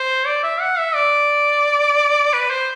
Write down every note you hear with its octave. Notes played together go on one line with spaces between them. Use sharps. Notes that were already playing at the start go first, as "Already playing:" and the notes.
Already playing: C5
D5
E5
F#5
E5
D5
B4
C5